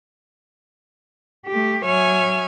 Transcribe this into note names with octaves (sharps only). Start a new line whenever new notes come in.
A3 G4
F#3 C#5 E5 G#5 F6